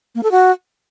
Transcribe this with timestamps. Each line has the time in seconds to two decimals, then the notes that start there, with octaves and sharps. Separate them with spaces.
0.15 A#3
0.23 A4
0.31 F#4